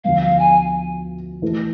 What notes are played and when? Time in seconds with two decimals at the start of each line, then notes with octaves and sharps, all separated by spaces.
0.04 D2 D3 F3 B3 F5
0.22 F5
0.39 G#5
1.42 E3 A3 E4 A4